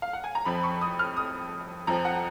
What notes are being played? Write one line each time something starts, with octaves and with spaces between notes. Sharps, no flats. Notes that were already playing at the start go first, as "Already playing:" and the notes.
F5
F#5
G#5
A#5
F2 F3 B5
C#6
D#6
F6
D#6
F2 F3 A#5
F#5